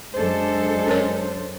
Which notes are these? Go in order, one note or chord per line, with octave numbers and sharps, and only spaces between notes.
F#2 G#3 D4 A4 C5
C#4 A#4 C#5